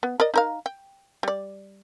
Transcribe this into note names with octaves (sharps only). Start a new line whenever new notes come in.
B3
A#4 D5 D#5
D#4 A#4 F5
G5
G3 D5